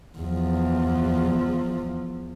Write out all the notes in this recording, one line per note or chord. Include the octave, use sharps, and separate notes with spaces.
E2 F3